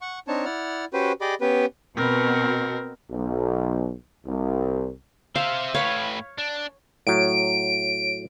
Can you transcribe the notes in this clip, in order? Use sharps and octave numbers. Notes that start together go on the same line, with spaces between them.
F#5 C#6
C4 D4 D#4 C#5 A5
E4 D5 F#5 F6
C#4 F#4 G4 B4 C5
G4 G#4 D5 D#5 B5 D6
B3 C#4 G4 B4
B2 C4 A#4
B1
C2
C4 C5 E5 F5
A2 B4 C#5 F5
D4
A2 F#3 D7